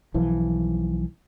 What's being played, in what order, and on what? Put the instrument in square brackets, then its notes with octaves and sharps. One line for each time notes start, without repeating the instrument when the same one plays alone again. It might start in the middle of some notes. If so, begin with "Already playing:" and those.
[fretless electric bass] B1 E3 F3